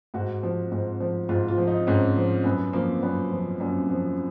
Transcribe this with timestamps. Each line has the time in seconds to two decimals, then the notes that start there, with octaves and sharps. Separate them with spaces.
0.14 G#2 F#4
0.43 F3
0.72 G#2
1.00 F3
1.29 G#2 F4
1.48 F4
1.58 F3
1.67 D#4
1.87 G#2 C#4
2.16 F3
2.44 F#2 B3
2.73 F3 A#3
3.02 F#2 B3
3.32 F3
3.60 F#2 A#3
3.89 F3